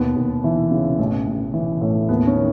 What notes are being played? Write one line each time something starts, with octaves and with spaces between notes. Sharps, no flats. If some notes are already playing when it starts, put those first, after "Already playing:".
Already playing: D#2 B2 B3
D#2
E3
C#3
A1
A1
E3
A2
D#2 B3
C#4
D#3